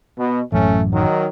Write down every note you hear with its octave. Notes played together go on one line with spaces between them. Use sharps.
B2
A1 F#2 A3 C#4
D#3 F#3